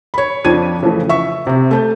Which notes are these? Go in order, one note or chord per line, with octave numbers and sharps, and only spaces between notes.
C#5 B5
F2 F3 D4 G#6 D#7
C#3 E3 F3 A3
E5 C#6
C3 C4
A3 A5 G6